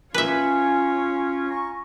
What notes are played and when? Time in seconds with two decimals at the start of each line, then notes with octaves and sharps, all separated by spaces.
0.14 C#4 F4 B4 C#5 E5
1.50 G#5 A#5 C#6